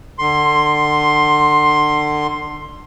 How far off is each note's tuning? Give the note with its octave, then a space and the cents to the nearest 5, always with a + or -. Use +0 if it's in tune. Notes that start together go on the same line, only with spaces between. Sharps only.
D3 +30 C6 +10